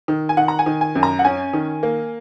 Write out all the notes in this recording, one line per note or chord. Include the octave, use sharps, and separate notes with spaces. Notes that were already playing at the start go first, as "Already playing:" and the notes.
D#3
G#5
D#3 F#5
A#5
G#5
D#3
G#5
F#2
A#5
F#5
C#4 G#5
D#3
A#3